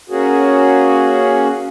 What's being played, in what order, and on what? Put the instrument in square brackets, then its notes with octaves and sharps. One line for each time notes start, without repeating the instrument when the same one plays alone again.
[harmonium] A#3 C#4 F#4 G#4